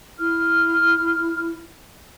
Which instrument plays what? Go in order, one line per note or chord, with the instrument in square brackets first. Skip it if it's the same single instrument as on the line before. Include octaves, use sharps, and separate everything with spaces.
[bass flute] E4 [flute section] F6